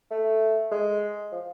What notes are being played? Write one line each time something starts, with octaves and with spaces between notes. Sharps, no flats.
A3
G#3
F3